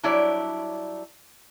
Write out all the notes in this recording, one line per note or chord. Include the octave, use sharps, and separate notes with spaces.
F#3 G3 D4 E4 C#5 D5